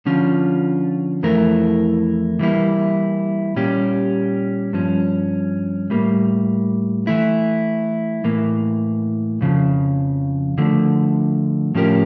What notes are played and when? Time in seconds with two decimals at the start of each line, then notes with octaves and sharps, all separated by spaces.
0.06 D3 F3 C#4 F4
1.23 F2 E3 A3 E4 A#4
2.39 E3 G3 A#3 E4
3.56 A#2 G3 C#4 G4
4.73 G2 F3 C#4
5.90 A2 G3 A#3
7.07 E3 A3 E4
8.24 A2 E3 A#3
9.41 F2 C#3 F3
10.58 D3 F3 A3
11.75 A2 F3 C#4 G4 A#4